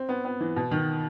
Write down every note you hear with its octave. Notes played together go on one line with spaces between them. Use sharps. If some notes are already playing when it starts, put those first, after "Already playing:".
Already playing: C4
B3
B3
E3
B2
D#3